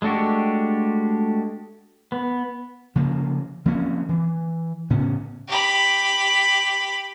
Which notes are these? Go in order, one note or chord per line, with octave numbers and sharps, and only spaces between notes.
G#3 A3 D4 F#4 G4
B3
C#3 F3 A#3
F3 A#3 C4 C#4
E3
A2 C#3 B3 C#4
G4 B5